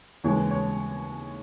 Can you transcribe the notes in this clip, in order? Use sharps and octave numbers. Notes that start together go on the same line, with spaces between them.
D#2 C#3 E3 G#3 C#5
C#5